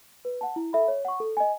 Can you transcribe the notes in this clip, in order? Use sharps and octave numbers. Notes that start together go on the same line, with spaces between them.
B4
F#5 A5
E4
A4 E5 B5
C#5
F#5 C#6
A4
D#5 G#5